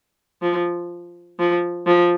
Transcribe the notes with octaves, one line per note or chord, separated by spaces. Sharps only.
F3
F3
F3